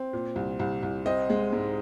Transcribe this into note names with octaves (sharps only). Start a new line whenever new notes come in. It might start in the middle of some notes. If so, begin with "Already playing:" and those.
Already playing: C4
A#2
C2
C2
C2
C4 D#5
G#3
G#2